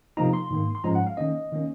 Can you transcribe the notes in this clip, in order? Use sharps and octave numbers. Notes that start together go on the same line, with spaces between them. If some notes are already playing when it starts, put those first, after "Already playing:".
C3 F3 A#3 D#4 A#5
C6
G#2 D#3 A#3
C6
G#2 F3 G#3 C#4 A#5
F#5
F5
D#3 A#3 C#4 D#5
D#3 A#3 C#4